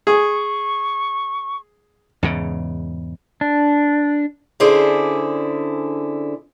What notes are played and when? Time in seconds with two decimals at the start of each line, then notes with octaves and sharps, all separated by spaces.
0.07 G#4 C#6
2.23 E2 G#2 C#3
3.41 D4
4.60 D3 C#4 E4 G#4 C5 D5